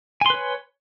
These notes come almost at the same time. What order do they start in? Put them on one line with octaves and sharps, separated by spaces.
G#5 C6 B4 C#5